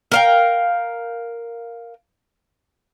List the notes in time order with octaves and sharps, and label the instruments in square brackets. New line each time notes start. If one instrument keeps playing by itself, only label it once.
[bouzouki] A#4 F5 G5